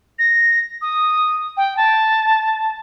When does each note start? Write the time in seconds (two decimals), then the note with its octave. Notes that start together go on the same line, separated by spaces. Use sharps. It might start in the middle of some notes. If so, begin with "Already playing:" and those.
0.19 A#6
0.82 D#6
1.57 G5
1.77 A5